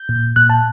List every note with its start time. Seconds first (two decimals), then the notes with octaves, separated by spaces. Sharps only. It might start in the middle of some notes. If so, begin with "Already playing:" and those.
Already playing: G6
0.09 A#2
0.36 A#2 F#6
0.49 A5